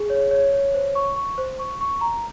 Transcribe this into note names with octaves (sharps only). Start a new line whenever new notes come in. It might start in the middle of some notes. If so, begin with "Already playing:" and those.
Already playing: G#4
C#5
C#5
C#5
C5
C#6
C#6
C5
C#6
C#6
A#5